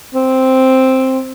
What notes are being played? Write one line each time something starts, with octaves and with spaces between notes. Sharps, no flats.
C4